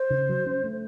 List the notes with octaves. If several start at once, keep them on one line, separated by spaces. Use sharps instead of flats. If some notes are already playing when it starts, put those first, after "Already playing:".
Already playing: C5
C#3
F#3
C#4
A3